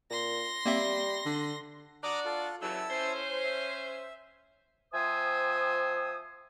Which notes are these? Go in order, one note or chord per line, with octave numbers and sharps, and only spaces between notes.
A#2 C6 A#6
G3 A#3 C4 E5
D3
D4 F#4 D5 A#5 D6 D#6
F4 A4
C#3 E3 F#3 E4 A4 E6
C#4 C5
E5
F3 C4 C5 E5 G#5 D#6